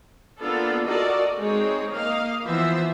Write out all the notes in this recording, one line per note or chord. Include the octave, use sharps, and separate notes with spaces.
A#3 B3 D4 F4 A4
F4 F#4 A4 A#4 D5 D#5
G#3 C4 D#4 C#5
A#3 D#5 F5
E3 F3 B3 C5 E5